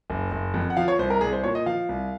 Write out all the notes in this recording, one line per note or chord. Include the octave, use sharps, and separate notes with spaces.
F#1
F#1
F2
F#5
F3 F5
C#5
C2 C5
A#4
C2 G#4
C5
A#2 C#5
D#5
F3 F5
C2